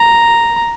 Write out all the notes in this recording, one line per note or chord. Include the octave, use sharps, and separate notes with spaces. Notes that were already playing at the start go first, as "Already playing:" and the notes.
Already playing: A#5